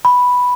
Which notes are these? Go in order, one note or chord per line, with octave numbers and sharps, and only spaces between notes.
B5